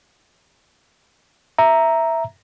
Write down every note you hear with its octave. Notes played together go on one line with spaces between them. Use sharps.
E5 A#5